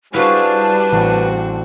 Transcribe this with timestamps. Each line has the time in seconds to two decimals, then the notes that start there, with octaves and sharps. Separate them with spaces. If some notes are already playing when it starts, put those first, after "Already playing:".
0.14 G3 D4 E4 F#4 G#4 B4 C5 F5
0.92 A1 C4 F#4